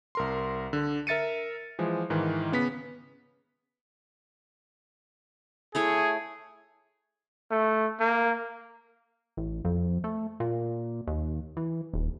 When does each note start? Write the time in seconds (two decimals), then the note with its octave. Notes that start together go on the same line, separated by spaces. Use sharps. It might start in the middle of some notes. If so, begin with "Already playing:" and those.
0.15 C2 A#4 C6
0.73 D3
1.07 A#4 E5 A6 C#7 D#7
1.79 E3 F3 G#3
2.10 G#2 D#3 E3
2.52 C#3 B3 B6
5.75 A3 E4 G#4 C#5
7.52 A3
8.00 A#3
9.37 A1
9.65 F2
10.04 A3
10.40 A#2
11.07 D#2
11.57 E3
11.94 D#1